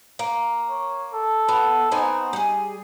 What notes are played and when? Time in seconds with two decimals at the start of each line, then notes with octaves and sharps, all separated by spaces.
0.19 A#3
0.70 C#5
1.14 A4
1.48 B3
1.91 B3 C4 D#4 G#5
2.33 G3 G#4